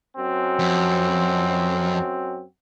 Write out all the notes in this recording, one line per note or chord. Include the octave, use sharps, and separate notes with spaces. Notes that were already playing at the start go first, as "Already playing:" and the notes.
F#2 C4 F#4
F2